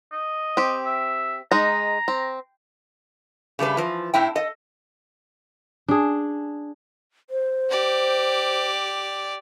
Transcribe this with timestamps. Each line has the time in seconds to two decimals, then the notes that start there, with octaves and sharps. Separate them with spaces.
0.12 D#5
0.57 C4 G4
0.85 E5
1.51 G#3 D#4 A#5
2.08 C4
3.59 C#3 G3 A3 B4
3.77 E3 F3
4.14 A2 C4 E4 G5
4.35 A4 D#5
5.88 D4 G#4
7.30 C5
7.69 G4 D5